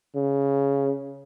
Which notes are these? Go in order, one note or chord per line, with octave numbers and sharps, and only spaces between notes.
C#3